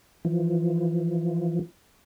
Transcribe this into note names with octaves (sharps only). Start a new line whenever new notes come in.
E3 F3